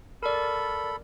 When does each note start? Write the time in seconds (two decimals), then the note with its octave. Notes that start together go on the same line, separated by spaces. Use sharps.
0.23 A4 A#4 D5 B5